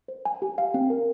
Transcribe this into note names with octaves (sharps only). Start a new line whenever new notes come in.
C5
G#5
G4
F5
C4
A#4